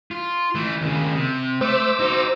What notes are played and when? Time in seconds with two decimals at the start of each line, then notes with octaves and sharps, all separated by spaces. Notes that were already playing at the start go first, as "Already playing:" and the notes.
0.11 F4
0.55 E3 A3
0.81 D#2 C#3
1.15 C3
1.61 A3 C5 D6 E6
2.00 D#4 F#4